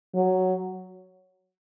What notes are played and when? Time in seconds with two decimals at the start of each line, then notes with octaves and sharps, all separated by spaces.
0.15 F#3